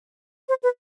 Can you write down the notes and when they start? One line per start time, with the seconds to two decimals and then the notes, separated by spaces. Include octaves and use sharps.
0.49 C5
0.63 B4